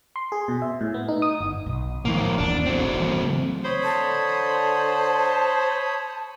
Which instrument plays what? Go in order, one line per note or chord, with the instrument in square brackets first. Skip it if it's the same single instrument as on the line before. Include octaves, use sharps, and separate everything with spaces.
[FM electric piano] C6
G#4
B2
E5
A2
B3
D#4
D#6
G1
[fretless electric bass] B1
[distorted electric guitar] F2 A#3 [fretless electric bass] A2 D#3 G#3
[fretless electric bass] D#1 A1 E2 [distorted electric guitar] D4
[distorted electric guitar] F#3 C4
[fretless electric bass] E3 G3 A#3
C#3 E3 A3
[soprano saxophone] C5 [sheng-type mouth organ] C#5 B5 D#6
[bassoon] D3 [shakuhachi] A5